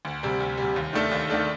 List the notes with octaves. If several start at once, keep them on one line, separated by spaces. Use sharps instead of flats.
D2
C3 G3
D2
C3 G3
D#2
D#3 A3 D4 A4
D#2
D#3 A3 D4 A4